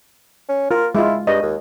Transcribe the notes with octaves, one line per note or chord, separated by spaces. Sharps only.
C#4
F4 A#4
G#3 E4 F4
G2 D#5
D#2